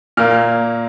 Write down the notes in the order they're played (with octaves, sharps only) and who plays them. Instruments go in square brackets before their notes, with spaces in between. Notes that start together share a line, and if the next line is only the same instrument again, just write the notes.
[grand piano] A#2 A#3 F6